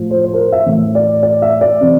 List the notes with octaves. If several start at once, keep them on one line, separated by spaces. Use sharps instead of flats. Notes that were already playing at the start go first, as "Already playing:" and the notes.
Already playing: A2 F3 A3
C5
C5
A#4
C5
E5
A2 E3 A3
D5
D5
E5
D5
C3 E3